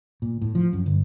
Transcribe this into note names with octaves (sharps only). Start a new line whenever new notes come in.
A#2
A2
F3
F#2
G1